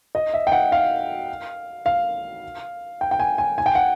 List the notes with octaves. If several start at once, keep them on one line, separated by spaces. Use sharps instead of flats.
D#5
E5
G5
F#5
F5
F5
G5
G5
G#5
G#5
G#5
G5
F#5